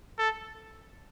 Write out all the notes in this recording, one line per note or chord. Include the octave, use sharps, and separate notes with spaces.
A4